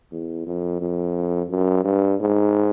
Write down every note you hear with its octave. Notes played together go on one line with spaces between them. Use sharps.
E2
F2
F2
F#2
G2
G#2